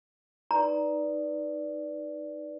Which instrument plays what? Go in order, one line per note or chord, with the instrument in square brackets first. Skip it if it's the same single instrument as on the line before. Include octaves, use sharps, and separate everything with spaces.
[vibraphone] D#4 B4 D5 [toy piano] A#5